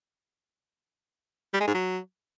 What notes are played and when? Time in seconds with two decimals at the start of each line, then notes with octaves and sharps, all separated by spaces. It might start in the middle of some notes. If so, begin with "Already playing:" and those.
1.53 G3
1.61 G#3
1.68 G#2
1.75 F#3